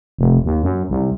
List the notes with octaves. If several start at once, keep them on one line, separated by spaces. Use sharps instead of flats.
F1
D#2
F#2
C2